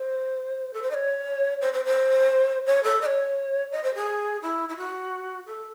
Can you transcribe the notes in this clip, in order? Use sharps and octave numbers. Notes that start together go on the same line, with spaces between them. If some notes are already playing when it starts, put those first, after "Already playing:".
Already playing: C5
A4
C5
D#5
C#5
C5
C5
C5
C#5
A4
D#5
C#5
D#5
C5
G#4
E4
E4
F#4
A4